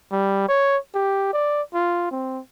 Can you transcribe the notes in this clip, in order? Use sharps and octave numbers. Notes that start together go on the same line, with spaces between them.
G3
C#5
G4
D5
F4
C4